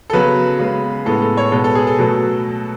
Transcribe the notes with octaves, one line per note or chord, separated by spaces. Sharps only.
A4
C#3 F#3 B3 B4
C#3 G#3 B3
A2 G#3 B3 A4
A4
C#5
B2 G#3 B3 A4
A4
G#4
A4
B2 F#3 A3